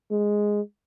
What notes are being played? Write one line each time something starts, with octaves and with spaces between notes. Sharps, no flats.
G#3